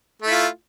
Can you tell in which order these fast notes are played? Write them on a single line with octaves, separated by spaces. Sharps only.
A3 E4 F4